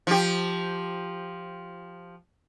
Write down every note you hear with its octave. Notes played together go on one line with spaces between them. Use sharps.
F3 G4